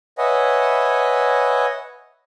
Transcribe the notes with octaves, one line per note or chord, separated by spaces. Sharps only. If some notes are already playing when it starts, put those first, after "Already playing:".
B4 C#5 D#5 E5 F#5 G#5